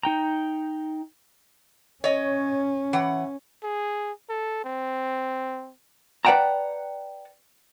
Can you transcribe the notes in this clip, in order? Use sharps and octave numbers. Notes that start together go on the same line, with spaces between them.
D#4 G5 A#5
C#4 C#5 D#5
E3 F#5
G#4
A4
C4
B4 D5 F#5 G5 A5 A#5